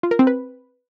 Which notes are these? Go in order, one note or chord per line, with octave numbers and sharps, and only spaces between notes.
F4
A#4
C4
B4